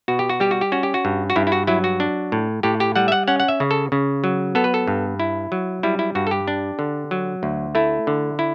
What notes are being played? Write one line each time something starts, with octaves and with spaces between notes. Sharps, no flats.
B2 F#4
G4
F#4
G3 G4
F#4
G4
C#4 F#4
G4
F#4
G2
F#4
G2 E4
E4
F#4
F#3 E4
F#4
D4
A2
A2 G4
G4
G3 F#5
E5
F#5
C#4 F#5
F#5
E5
C#3
A4
C#3
F#3
B3 A4
B4
A4
G2
E4
F#3
G3 E4
E4
G2 F#4
A4
G4
D4
D3
F#3
D2
A3 E4
D3
E4